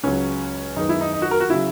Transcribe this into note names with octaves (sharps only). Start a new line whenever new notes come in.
C#2 C#3 F#3 C#4
F#2 D#3 G#3 B3 D#4
E4
D#4
D#4
F#4
A#4
F#4
C#3 F#3 E4